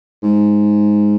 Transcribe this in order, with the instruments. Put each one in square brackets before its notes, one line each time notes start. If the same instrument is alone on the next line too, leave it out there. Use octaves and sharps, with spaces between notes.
[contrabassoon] G#2